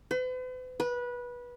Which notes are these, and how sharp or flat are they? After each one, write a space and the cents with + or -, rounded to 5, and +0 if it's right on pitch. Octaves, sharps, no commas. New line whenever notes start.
B4 +45
B4 -20